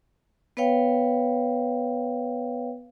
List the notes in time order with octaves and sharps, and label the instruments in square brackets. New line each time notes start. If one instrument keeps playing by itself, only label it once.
[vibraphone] B3 B4 C#5 F5 G5